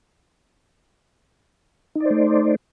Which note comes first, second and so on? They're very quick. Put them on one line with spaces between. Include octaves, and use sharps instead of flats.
D#4 D5 C5 A3